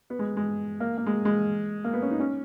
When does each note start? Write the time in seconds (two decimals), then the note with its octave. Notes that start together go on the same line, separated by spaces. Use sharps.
0.10 B3
0.19 G#3
0.37 G#3
0.80 A#3
0.98 A#3
1.06 G#3
1.25 G#3
1.84 A#3
1.93 B3
2.02 C#4
2.11 D#4
2.20 C#4